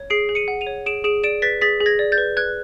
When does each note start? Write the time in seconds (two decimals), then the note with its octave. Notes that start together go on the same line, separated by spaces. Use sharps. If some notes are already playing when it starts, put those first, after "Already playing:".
Already playing: C#5
0.10 G#4 C7 D7
0.29 G#4
0.35 C#7 D#7
0.48 F#5
0.61 D#7 F7
0.67 C#5
0.86 G#4 D7 E7
1.04 G#4 D7 E7
1.23 D5 D7 E7
1.42 B4 A6 B6
1.61 G#4 A6 B6
1.80 G#4
1.86 G#6 A#6
1.99 D5
2.12 G6 A6
2.18 B4
2.37 B4 F#6 G#6